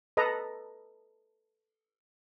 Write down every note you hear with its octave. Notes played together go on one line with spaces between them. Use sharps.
A4 B4 D#5 A#5